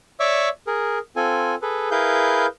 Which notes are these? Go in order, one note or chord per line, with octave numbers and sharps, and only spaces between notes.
C#5 D5 E5 C#6 D6 E6
G#4 A#4
C4 F4 A4 G#5
G#4 A4 B4
E4 G#4 A#4 B4 F5 G6